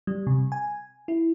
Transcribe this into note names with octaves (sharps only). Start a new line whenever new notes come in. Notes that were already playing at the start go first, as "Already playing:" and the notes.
G3
C3
G#5
E4